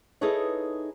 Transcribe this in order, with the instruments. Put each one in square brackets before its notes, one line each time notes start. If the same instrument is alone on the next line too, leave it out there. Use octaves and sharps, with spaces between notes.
[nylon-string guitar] D#4 E4 G#4 A4 B4 C#5